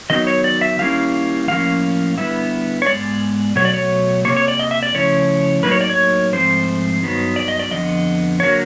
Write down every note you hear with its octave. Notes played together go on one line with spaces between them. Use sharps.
D#3 F#3 B3 D#4 D#5
C#5
D5
E5
D#3 G3 A#3 C#4 E4 F5
A2 F3 A#3 C#4 F5
D3 G3 B3 E4 E5
C#5
G#2 D#3 G#3 B3 D5
B2 F#3 A3 C#5
D5
C#5
C3 F3 A#3 C#5
C#5
D5
D#5
E5
D5
C#3 F3 A3 C#4 E4 C#5
A2 F#3 A#3 D#4 B4
C#5
D5
C#5
G#2 F3 A3 C4 C5
G2 D#3 F#3 B3
D5
D#5
D5
F2 D3 F3 B3 D#5
D3 F#3 A#3 C#5